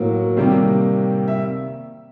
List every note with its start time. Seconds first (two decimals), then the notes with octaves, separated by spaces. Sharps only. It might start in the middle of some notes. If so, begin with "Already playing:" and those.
Already playing: A2 F#3 A#3
0.37 C3 D#3 G3 A#3
1.28 E5